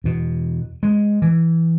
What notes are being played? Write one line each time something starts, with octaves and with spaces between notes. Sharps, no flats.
E2 B2
G#3
E3